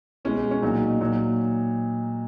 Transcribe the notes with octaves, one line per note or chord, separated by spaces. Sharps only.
B2 G#3 C#4
C#4
A#2 F#3 D#4
A#2 F#3